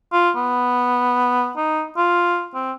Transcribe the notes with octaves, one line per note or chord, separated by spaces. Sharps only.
F4
B3
D#4
F4
C4